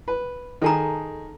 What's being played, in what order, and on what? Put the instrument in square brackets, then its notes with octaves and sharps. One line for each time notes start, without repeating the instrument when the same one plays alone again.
[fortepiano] B4
[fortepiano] D#3 G#4 [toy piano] A4 A5 A#5